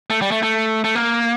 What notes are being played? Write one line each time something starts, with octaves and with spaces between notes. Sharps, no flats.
A3
G3
A3
A3
A3
A#3